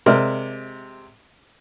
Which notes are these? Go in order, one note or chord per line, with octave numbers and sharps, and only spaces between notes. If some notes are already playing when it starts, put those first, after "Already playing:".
C3 G#3 A#4 D5 E5 F6